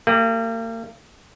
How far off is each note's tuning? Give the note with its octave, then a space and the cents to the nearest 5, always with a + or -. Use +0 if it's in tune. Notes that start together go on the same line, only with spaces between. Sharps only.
A#3 -40 G4 +0